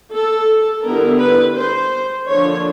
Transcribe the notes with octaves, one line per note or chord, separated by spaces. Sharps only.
A4
D3 G3 B3 E4 A#4
B4
C5
D3 F3 A#3 D4 C#5